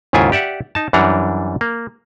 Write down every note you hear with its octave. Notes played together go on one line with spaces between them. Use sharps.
D#2 G#2 C#3 E4 F4 G#5
G4 D5 E5 F#5
D#4 A5
F#2 E3 G3 D4 F#5 A#5
A#3